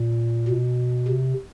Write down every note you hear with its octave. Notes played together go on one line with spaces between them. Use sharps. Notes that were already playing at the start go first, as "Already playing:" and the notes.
Already playing: A#2
B2
C3